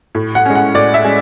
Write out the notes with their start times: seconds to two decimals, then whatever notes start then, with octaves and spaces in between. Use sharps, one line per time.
0.15 A2
0.35 F#5
0.46 G#3 C#4
0.55 F#5
0.74 A2 D5
0.94 E5
1.04 G#3 C#4